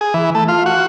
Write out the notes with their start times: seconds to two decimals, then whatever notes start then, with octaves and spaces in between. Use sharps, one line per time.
0.01 G#4
0.14 E3
0.35 A3
0.48 F4
0.66 F#4